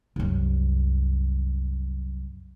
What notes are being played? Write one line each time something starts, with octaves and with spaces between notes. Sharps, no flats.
C2 F#2